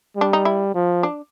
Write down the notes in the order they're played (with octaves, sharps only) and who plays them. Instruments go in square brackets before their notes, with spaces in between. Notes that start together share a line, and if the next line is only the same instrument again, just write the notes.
[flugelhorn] G3 [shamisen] D4
[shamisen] D#4
E4
[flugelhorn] F3
[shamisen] D4